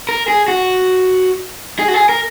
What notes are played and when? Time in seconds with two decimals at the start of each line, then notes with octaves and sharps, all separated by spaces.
0.09 A#4
0.28 G#4
0.48 F#4
1.79 G#4
1.88 F#4
1.94 G#4
2.09 A#4